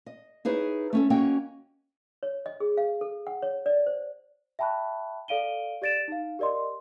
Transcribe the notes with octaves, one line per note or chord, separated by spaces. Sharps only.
D#5
D#4 E4 G#4 B4 C#5
A3 C#4 A4
A#3 C#4 F#4 D#5 G5
C#5
D#5
G#4
F5
A4
F#5
C#5
D5
C5
E5 G5 A5 B5 C#6 F#6
A4 D5 F5 D7 D#7 G7
G4 D5 A6 D7 E7
D#4 F5
G4 A#4 D5 D#5 C6